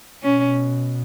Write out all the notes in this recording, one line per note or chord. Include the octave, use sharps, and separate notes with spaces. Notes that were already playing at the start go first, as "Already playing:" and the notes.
B2 C#4